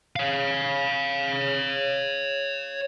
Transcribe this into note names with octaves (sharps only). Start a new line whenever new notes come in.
C#5 F5